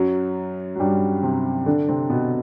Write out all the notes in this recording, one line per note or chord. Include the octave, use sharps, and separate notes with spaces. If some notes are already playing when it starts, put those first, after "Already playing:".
Already playing: F#2 F#3
F#3
G2 G3
C3 C4
D3 D4
C3 C4
B2 B3